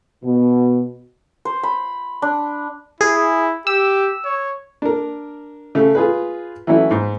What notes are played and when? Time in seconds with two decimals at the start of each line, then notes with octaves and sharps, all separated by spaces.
0.24 B2
1.45 C5
1.63 B5
2.22 D4
3.01 E4 G#4
3.67 G4 E6
4.25 C#5
4.82 D4 A#4
5.75 C#3 A3 A4
5.95 F4 G#4 B4
6.67 E3 F#3 A3 C#4 E4
6.91 G#2